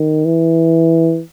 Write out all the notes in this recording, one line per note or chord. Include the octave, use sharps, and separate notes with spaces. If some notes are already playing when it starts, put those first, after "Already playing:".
Already playing: D#3
E3